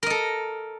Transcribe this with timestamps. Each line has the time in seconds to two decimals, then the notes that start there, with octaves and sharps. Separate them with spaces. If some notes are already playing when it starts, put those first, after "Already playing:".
0.03 A#4
0.06 D#5
0.10 A4